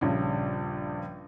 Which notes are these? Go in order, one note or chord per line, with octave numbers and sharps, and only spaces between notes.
A#1 G2 C#3